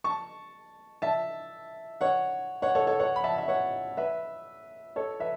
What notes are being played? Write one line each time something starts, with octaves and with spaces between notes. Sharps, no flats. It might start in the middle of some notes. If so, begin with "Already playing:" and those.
A5 C#6
E5 A5
C#5 F#5
C#5 F#5
A4 C#5
A4 C#5
C#5 F#5
B5
E5 A5
E5
C#5 F#5
B4 E5
A4 C#5
B4 E5